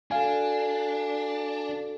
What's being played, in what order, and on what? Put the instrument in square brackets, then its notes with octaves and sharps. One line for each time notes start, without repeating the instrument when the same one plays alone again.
[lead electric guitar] D4 [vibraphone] F#4 A4 [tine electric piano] F5 G#5